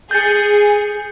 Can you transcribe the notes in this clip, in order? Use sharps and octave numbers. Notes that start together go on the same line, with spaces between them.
G#4 G6 A6 C#7